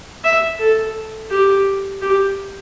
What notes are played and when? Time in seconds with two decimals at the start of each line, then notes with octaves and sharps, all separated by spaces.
0.24 E5
0.59 A4
1.30 G4
2.02 G4